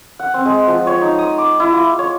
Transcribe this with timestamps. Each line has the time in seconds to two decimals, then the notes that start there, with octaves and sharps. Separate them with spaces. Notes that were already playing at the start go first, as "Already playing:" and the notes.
0.20 F#5
0.34 C4
0.45 G#3
0.67 F3
0.87 C#5
1.02 D#4
1.19 D#6
1.38 D6
1.60 E4
1.73 F4
1.99 C#5